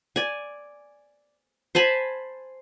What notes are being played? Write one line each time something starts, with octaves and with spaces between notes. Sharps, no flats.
D5 G#5
C5 G#5 A5 B5